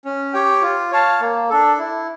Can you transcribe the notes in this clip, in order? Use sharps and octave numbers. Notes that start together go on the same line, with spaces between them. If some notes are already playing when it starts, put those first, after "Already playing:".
C#4
G4 C#5 G5
F4
C#5 F5 A5
A#3
D4 A4
E4